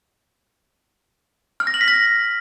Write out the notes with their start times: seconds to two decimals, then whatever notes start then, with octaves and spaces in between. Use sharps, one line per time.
1.60 F6
1.67 A#6
1.74 F#7
1.81 B6
1.88 A#6